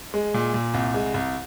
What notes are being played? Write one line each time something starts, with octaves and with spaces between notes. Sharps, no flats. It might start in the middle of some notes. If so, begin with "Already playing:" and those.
G#3
A#2
A#2
C2
G#3
C2